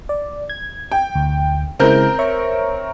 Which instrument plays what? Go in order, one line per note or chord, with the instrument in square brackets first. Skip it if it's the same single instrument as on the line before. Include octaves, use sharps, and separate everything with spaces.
[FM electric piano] D5
G#6
[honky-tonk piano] G5
[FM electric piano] D2
[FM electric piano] C#3 G#3 E4 [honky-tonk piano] C4 A#4 G6
[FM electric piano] C#5 E5 C#6